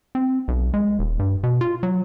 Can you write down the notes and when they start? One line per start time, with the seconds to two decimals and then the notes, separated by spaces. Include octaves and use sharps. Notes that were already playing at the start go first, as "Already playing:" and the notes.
0.15 C4
0.48 B1
0.74 G#3
0.99 D#1
1.19 G2
1.43 B2
1.61 F4
1.83 F#3